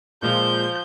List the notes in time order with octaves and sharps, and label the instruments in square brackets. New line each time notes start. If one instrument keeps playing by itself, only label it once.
[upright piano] A#2 G#3 [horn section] F3 [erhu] G6